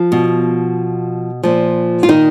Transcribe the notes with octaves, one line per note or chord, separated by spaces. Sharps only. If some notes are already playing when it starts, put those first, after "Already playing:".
Already playing: F3 F4
B2
A#2 F3
F4
D#3 D#4